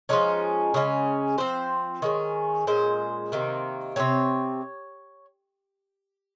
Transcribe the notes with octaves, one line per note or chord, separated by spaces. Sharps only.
F3 G#3 C#4 D#4
C#3 G#3 C#4
F3 C4 C5
D#3 G#3 C#4
A#2 G#3 C#4 C5
C3 D#3 A#3
C3 F#3 C4 C#5